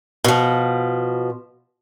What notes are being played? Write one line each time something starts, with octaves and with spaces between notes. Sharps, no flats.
B2 F3